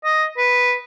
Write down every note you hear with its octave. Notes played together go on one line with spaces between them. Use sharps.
D#5
B4